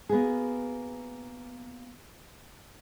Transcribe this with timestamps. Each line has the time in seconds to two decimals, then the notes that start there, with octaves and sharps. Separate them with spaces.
0.09 A#3 B3 F#4 G#4